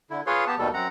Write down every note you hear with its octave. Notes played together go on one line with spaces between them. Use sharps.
D3 E4
F4 G#4 B4 C#5 C6
B3 G4 A5
D#2 B2 D#3 G3 A4
F#2 C4 F#5 A#5